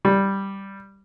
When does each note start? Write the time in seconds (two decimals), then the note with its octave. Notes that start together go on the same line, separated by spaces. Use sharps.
0.05 G3